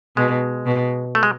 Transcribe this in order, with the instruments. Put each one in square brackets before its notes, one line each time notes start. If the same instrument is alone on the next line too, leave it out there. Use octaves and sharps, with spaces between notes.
[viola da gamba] B2 [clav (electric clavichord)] G#3
[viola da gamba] B2
[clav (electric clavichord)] A3
G#3